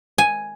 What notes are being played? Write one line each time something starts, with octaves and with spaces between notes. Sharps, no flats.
G#5